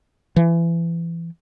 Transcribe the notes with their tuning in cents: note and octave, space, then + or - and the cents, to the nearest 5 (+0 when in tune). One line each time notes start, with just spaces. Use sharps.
E3 +30